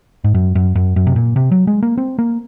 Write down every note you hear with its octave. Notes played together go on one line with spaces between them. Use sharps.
G#2
F#2
F#2
F#2
F#2
C3
A#2
C3
F#3
G#3
A#3
C4
A#3